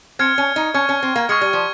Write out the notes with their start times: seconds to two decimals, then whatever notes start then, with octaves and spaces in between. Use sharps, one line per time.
0.19 C4 F6 G#6 C#7
0.38 C#4
0.56 D#4
0.74 C#4 C#6 F6 G#6 C#7
0.89 C#4
1.03 C4
1.16 A#3
1.29 G#3 C#6 F6 G#6 C#7
1.41 G3
1.53 F3